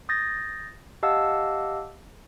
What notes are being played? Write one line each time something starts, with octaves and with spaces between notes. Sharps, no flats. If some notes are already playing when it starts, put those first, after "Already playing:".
D#6 G6 A6 A#6
G4 D#5 F5 F#5 A5 E6